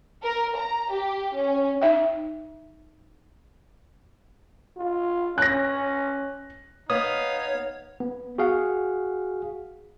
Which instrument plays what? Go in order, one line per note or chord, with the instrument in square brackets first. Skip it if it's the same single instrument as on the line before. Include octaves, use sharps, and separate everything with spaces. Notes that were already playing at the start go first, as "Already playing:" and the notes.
[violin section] A#4
A#5
G4
C#4
[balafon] D#4 E5 G5
[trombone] F4
[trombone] C#4 [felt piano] F#6 A#6
[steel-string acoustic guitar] B3 [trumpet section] D#4 F5 [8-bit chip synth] C#5 [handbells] D#6
[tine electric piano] B3
F#4 G#4 F5 F#5